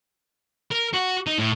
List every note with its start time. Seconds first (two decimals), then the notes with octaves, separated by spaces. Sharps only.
0.72 A#4
0.94 F#4
1.27 D#4
1.38 A2